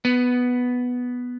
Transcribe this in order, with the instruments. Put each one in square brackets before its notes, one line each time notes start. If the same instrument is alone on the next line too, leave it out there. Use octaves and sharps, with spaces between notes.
[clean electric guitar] B3